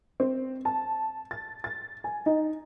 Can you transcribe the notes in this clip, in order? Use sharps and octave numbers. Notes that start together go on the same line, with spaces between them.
C4
A5
A6
A6
G#5
D#4